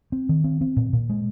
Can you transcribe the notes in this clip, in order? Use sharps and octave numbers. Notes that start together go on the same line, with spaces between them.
C4
D#3
C4
C4
A#2
A#2
G#3